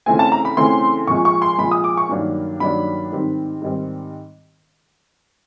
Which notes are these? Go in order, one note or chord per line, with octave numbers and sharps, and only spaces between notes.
C#3 E3 A3 C4 G#5
A5
A#5
B5
C#3 E3 A3 C4 C6
A#2 F3 G#3 C#6
C#6
C6
A#2 F3 G#3 B5
D#6
D6
C#6
G2 D#3 F#3 A#3 D4
G2 D#3 F#3 A#3 D4 B5
G#2 D#3 G3 C4
G#2 D#3 G3 C4